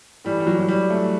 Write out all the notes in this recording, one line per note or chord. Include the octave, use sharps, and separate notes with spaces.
A2 E3 G3
G3
F#3
F#3
G3
A3